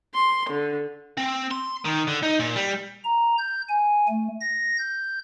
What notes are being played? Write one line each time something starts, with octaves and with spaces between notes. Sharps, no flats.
C6
D3
C4
C6
D#3
D3
D#4
A#2
G3
A#5
G6
G#5
A3
A#6
G6